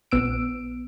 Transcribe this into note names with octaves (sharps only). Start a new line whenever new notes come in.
A#1 B3 E6 D7